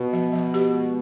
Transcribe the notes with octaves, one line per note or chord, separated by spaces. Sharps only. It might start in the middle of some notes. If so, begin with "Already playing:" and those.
Already playing: B2
F3
F3
G4
G#3